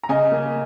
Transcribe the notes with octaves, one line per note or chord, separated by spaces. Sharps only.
A#5
C#3 D#5 G#5
A#3